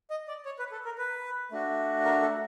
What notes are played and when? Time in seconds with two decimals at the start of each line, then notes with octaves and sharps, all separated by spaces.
0.10 D#5
0.28 D5
0.45 C#5
0.59 B4
0.72 A4
0.85 A#4
0.98 B4
1.52 A3 D4 F#4
2.05 A#4
2.22 A4